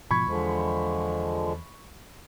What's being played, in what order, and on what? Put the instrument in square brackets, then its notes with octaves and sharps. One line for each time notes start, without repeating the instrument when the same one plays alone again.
[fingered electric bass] G#2 B2 F3 [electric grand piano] B5 C#6 G#6
[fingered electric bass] E2 [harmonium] D3 F3 G#3